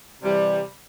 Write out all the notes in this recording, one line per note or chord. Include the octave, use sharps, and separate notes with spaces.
C3 E3 G3